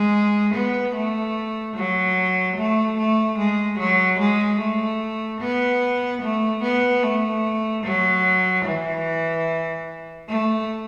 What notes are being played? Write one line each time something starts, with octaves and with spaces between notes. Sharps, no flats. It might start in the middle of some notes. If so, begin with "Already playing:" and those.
Already playing: G#3
B3
A3
F#3
A3
A3
G#3
F#3
G#3
A3
B3
A3
B3
A3
F#3
E3
A3